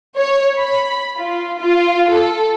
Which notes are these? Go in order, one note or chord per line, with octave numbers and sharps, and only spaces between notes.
C#5
B5
F4
F4
A4